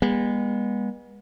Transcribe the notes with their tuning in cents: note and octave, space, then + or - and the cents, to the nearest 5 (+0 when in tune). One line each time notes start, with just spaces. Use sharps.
G#3 -35 B3 -30